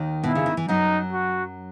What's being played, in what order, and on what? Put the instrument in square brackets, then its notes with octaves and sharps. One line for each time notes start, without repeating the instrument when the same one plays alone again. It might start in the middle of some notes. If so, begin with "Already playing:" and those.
Already playing: [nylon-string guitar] D#2 D#3
[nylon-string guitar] B2 [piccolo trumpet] E4
[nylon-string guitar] C#3
D#3
E3
[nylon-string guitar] F#2 F#3 [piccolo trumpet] D#4
[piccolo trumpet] F#4